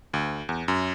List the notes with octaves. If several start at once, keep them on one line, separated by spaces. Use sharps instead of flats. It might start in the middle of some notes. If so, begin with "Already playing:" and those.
D2
E2
F#2